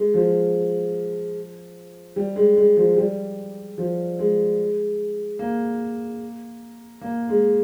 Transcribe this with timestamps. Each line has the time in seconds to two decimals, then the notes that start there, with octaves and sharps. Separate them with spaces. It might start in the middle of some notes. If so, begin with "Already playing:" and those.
Already playing: G#3
0.14 F3
2.16 G3
2.36 G#3
2.57 G#3
2.77 F3
2.97 G3
3.78 F3
4.19 G#3
5.39 A#3
7.01 A#3
7.29 G#3